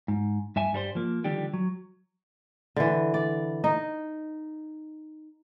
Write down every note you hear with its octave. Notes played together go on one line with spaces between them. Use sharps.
G#2
G2 E5 G#5
G2 G3 A#4 C5
F3 A#3
D3 D#3 F3 G3 G4
F#3
D3 E3
D5
D#4